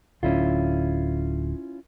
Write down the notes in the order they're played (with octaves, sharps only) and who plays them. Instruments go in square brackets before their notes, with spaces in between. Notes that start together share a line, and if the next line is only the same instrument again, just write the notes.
[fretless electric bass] D1 D3 [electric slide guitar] C#4 E4 F4